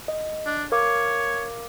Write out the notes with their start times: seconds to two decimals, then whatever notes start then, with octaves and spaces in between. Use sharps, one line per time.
0.08 D#5
0.46 D4
0.72 A#4 C#5 F5 D6